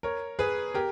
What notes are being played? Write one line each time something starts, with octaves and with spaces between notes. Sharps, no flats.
A#4 C#5
G#4 B4
G4 A#4